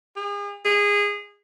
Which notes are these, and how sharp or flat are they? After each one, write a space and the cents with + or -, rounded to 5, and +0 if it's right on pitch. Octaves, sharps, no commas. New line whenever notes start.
G#4 -40
G#4 -20